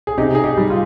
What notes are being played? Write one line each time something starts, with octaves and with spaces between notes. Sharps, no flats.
G#4
C3 D#4 G4
G#4
D#4 G4
G3
F4